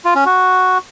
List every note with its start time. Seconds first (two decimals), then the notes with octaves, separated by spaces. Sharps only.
0.05 F4
0.15 C#4
0.26 F#4